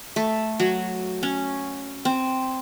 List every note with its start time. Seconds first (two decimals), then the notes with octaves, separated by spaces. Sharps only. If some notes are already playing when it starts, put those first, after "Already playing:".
0.16 A3
0.60 F#3
1.23 C#4
2.05 C4